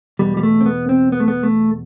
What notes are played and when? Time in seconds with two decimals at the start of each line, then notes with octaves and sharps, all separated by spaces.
0.19 E2 B2 G3
0.37 G3
0.43 A3
0.61 C4
0.66 B3
0.89 C4
1.12 B3
1.20 A3
1.28 B3
1.43 A3